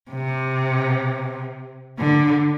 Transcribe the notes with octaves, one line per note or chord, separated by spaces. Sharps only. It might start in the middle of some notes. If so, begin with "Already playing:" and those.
C3
D3